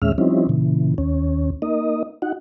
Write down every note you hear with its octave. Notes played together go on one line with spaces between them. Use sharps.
D#2 A#2 G#3 C#4 E5 F6
F3 G3 C4 C#4 D#4 E4
A#2 C#3 E3
D#2 C#4
A#3 D#4 D#5
D#4 F#4 F#5